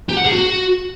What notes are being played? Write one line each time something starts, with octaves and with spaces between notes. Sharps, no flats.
G4
F#5
G#4
F#4